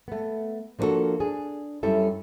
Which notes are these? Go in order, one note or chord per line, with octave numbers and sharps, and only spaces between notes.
A3 B3
F3 A#3 D4 D#4 F#4 A4
D4 G#4
F#2 G3 C#4 E4 A4 E5